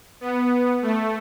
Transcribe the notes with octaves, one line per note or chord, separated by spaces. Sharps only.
B3
A3